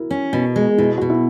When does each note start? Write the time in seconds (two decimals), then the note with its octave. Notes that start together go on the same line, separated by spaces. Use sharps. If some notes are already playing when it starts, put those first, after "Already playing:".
Already playing: E4 F#4 A#4
0.11 C#4
0.33 B2
0.56 G#3
0.78 B2 E4
0.98 B2 F#4
1.10 E4